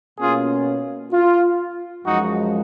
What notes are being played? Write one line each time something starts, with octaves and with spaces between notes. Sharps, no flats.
B2 A#3 C#4 F4 G#4
F4
F#2 F3 G#3 D#4 F#4